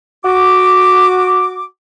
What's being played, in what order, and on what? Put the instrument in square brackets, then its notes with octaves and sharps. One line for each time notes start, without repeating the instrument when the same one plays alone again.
[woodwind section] F#4 D6